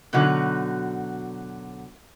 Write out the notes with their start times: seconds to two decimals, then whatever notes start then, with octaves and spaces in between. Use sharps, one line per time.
0.13 B2 D3 F#3 D#4 F#4